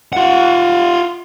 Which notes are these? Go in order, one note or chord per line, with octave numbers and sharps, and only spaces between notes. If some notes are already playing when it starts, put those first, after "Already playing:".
F4 F#5